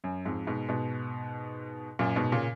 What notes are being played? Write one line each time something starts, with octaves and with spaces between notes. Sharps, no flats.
F#2
F2 G#2
G#2 B2
G#2 B2
F#2 A#2
G#2 B2
A#2 C#3